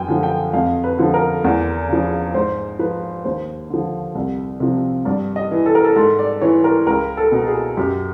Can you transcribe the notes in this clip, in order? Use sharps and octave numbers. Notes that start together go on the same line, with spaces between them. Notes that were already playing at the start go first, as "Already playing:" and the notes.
Already playing: F#2 G5 G#5
D3 F3
G5
F2 F5
B4
D3 F3
A#4
E2
C#3 F3
G#2 C5
F3 B4
D#2 C5
D3 F3
C2
C3 F3
G2 D5
D#5
E3
A4
A#4
A4
G#2 A4
D5
E3 C#5
A#4
C#2 A#4
A4
B2
G#4
F#2 G4